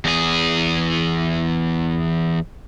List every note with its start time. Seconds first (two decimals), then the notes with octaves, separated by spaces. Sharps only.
0.05 E2 G#4